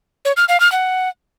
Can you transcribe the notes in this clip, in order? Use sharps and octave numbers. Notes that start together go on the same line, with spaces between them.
C#5
F6
F5
F6
F#5